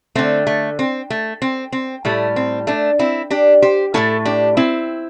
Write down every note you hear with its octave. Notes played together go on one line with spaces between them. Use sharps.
D3 A3 C4
A3
C4
A3
C4
C4
A2 G3 A3
C4
A3 D4
C4 E4
D4 G4
G4 C5
A2 E3 A3 E4 A4
D4 G4
C4 E4